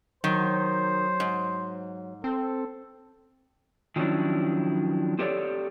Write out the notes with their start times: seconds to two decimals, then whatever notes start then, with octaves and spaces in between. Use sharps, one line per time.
0.24 D#3 F#3 C5
1.20 G#2
2.24 C4 A4
3.96 D#3 F3 F#3 C#4 D4 E4
5.19 C4 G4 A4 C#5 D5